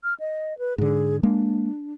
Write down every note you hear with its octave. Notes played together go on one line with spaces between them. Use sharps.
F6
D#5
B4
G#2 D3 G#4
G#3 A#3 D4